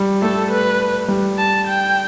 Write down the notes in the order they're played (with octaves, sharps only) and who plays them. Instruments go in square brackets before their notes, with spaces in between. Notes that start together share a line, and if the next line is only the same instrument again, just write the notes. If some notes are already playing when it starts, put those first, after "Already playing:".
Already playing: [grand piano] G3
[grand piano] A3 [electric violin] A4
[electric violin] B4
[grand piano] G3
[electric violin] A5
G5